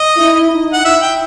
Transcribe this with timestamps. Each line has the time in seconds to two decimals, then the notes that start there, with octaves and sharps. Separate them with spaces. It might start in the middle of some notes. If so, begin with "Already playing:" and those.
Already playing: D#5
0.17 E4
0.51 D#4
0.73 F#5
0.85 E4 E5
1.02 G5